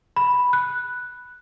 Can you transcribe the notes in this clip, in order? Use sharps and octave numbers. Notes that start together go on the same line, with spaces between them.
B5
F#6